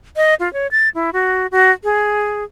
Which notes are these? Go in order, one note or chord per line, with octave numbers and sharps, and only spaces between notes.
D#5
F4
C#5
A6
E4
F#4
F#4
G#4